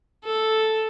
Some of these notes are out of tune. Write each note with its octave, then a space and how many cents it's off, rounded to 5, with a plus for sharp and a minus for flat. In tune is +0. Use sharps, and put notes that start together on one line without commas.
A4 -5